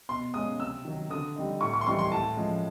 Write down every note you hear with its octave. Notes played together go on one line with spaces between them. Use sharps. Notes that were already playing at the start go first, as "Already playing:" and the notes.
B2 C6
G#3 C#4 D#6
C3 E6
D#3 F#3
D3 D#6
G3 C4 D#4
A2 C#6
C#6
C6
E3 G3 C4 D#4 C#6
C6
A2 A5
F3 G#3 C#4